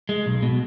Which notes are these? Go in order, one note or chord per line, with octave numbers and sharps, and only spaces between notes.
G#3
B1
B2